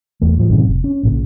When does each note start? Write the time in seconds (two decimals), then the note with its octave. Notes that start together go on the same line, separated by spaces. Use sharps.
0.22 E2 A3
0.37 A2 F3
0.50 A1 F#2 C3 D#3
0.64 F1
0.84 C#4
1.03 A#1 A#2 C#3